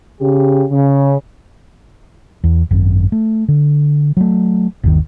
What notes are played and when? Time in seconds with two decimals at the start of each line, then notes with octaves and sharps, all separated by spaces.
0.20 C#3 G4
0.71 C#3
2.44 E2
2.71 G#1 F#2
3.12 A3
3.48 D3
4.17 F#3 A3
4.83 G1 D#2 D#3